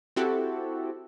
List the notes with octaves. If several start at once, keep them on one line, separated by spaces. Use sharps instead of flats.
C4 E4 F#4 G4 A4